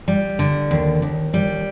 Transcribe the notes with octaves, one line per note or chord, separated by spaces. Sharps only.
G3
D3
D#2
D#2
G3